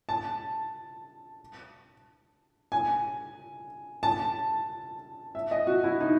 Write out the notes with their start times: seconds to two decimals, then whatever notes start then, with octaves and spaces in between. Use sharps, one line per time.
0.09 A5
2.72 G#5
4.03 A5
5.35 E5
5.51 D#5
5.67 F#4
5.84 E4
6.01 D#4